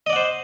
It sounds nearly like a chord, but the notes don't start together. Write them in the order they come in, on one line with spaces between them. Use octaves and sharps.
D#5 D5 F#5 C5